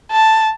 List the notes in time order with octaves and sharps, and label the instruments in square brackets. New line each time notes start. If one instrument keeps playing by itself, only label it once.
[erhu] A5